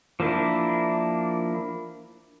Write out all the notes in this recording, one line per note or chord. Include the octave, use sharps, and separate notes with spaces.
F3 A#3 D4 E4